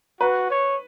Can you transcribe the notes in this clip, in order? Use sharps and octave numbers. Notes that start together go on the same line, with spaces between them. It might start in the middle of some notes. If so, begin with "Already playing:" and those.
F#4 B4
C#5